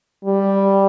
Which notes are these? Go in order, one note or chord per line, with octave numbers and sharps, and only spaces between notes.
G3